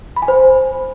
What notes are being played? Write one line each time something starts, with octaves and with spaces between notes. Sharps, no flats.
B5
G#5
C5